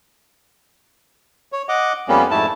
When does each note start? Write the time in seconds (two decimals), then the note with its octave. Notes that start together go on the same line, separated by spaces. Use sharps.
1.52 C#5
1.69 D#5 F#5 D6
2.08 F2 G3 A#3 B3 C#4
2.31 F2 G#2 A3 E4 A5